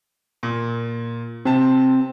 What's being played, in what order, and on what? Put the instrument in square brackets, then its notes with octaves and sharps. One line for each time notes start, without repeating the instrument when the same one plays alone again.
[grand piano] A#2
[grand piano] C3 A5 [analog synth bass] C4